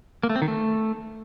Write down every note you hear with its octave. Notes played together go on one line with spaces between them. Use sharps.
A#3
A3
C4
D#3
A3